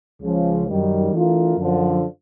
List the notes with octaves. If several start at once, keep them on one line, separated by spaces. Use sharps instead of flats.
C#2 C#3 F3
F#2 D#3 G3
E3 A3 D4 F4 A#4
F#2 D3 F3